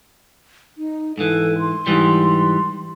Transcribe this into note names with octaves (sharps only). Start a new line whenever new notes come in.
D#4
G#2 E3 A4
C6
G#2 E3 G3